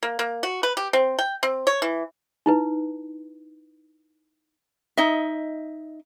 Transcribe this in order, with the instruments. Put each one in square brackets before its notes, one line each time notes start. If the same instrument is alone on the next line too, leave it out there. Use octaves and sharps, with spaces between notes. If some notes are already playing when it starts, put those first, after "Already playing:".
[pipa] A#3
A#3
F#4
B4
G4
C4
G5
C4
C#5
E3
[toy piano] D#4 E4 B4
[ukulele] D#4 D#5 E5